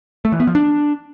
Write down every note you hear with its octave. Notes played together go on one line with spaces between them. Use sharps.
A3
E3
B3
F3
D4